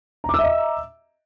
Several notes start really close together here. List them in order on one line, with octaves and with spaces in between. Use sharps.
A#5 D6 E6 E5 D#5